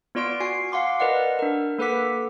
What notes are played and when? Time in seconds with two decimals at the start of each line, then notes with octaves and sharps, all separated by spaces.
0.15 B3 F4 D5 C6 D7
0.40 F#4 G#5 C7
0.72 F5 F#5 C6 D6
1.00 A#4 B4 D5 D#5 F#5
1.39 D4 A#4
1.78 A#3 A4 B4 F#5 D6 B6